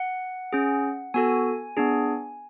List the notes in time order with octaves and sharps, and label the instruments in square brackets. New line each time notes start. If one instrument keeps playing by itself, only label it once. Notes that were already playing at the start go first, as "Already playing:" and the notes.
Already playing: [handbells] F#5
C#4 G#4
B3 F#4 A4 G#5
B3 D4 G#4